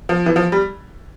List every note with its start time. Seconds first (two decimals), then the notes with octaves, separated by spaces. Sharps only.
0.09 F3
0.26 E3
0.36 F3
0.52 G3